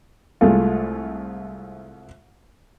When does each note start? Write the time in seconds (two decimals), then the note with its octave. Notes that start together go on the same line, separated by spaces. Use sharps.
0.41 C2 G#3 A3 F4